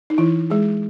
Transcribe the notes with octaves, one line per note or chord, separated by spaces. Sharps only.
D#4
E3 E4
G#3 G#4